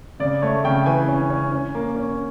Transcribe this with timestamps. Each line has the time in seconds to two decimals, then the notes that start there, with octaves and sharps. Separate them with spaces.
0.20 C#3 D5
0.42 A3 C#5
0.64 C#3 G5
0.86 E3 G#5
1.08 C#4
1.30 C#4
1.52 C#4
1.75 A#3
1.96 C#4